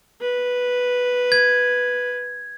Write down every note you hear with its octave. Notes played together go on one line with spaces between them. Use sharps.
B4
G#6